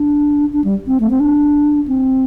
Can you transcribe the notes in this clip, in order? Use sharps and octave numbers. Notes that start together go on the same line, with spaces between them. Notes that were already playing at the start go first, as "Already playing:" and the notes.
Already playing: D4
D4
G3
C4
A3
C4
D4
C4